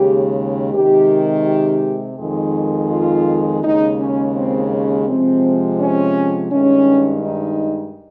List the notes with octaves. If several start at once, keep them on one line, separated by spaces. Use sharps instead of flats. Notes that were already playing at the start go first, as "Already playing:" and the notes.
Already playing: D#2 C#3 G#3 G4
C3 D#3 G#3 G4
G4
F2 D#3 G#3
F4
D#2 C#3 G#3 D#4
C#4
C4
C#4
C3 F3 G#3 C4
C#4
G2 D#3 G#3 C#4
D#4